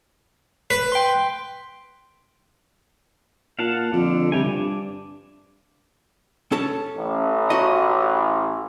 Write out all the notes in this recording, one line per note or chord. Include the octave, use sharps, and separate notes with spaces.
B4
G5 C6
A#2 F5 F#5 A5
F2 D3
C3 G3 G4 G#5
G2 D4
C#4 A4 A5
A1
F#4 G4 D#5